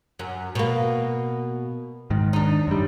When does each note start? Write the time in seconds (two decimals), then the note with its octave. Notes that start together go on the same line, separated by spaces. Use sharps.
0.19 F#2
0.55 B2 A#3
2.10 G#2 D#3
2.33 D4 D#4
2.67 F#2 G3